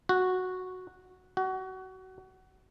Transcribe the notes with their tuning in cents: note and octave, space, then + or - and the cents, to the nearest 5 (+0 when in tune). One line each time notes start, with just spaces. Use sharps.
F#4 -5
F#4 +25